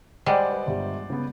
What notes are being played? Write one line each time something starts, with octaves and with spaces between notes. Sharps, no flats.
G3 G#3 C5 D5 F#5
B4 D#5
G1 G4
C#3 B3